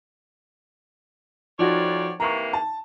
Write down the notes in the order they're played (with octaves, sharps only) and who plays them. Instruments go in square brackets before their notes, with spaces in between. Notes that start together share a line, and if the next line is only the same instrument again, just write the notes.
[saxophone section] F2 C#5 D5 [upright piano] F3 D#4 F#4
[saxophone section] C3 E3 A#3 [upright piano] A#5 C#6
[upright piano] A5